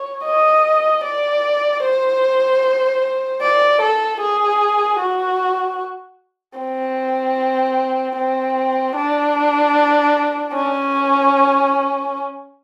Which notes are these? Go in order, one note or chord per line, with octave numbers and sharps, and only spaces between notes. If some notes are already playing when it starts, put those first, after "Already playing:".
Already playing: C#5
D#5
D5
C5
D5
A4
G#4
F#4
C4
C4
D4
C#4